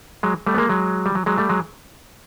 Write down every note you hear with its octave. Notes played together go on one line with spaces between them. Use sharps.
F#3 G#3
G3 A3
B3
G#3 A#3
F#3 G#3
G3
F#3
F#3 G#3
G3 A3
F#3 G#3